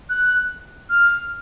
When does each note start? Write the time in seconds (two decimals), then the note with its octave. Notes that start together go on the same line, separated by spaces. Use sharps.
0.09 F#6
0.89 F6